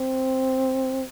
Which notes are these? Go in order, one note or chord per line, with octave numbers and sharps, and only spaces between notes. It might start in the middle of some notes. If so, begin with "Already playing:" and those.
Already playing: C4